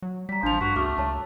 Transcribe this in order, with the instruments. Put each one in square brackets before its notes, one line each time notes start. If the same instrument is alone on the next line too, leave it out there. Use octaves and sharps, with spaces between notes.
[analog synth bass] F#3
[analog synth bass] G3 [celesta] A#5 B6
[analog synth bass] A1 [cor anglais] F3 [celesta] D4 F7
[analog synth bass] G2 [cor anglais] F#4 [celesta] B6
[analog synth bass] C#2 [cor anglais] A3 [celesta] F#4 D6 F6
[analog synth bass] C#2 [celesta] C#5 A5